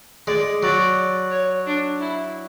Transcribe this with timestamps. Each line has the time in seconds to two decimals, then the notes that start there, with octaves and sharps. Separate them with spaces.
0.27 G#3 D5
0.62 F#3 D5
1.31 C#5
1.66 D4
2.00 E4